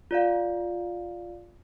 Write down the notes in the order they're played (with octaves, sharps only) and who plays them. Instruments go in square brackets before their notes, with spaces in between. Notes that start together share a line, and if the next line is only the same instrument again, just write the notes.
[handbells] F4 D5 F5